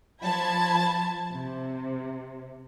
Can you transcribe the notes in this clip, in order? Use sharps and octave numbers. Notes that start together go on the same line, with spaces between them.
F3 A5 B5 G#6
C3